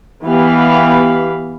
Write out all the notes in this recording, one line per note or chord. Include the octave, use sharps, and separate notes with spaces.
E3 B3 G4 F5 B5